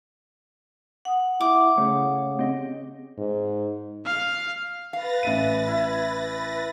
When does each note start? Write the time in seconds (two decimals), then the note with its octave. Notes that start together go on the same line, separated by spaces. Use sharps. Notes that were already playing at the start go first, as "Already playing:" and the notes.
1.05 F#5 D#6
1.41 E4 D6
1.78 C#3 A3 C#5
2.39 C4 G4 D#5
3.18 G#2
4.06 F5
4.93 B4 F5 A6 A#6
5.23 A1 E5 D#7
5.68 E4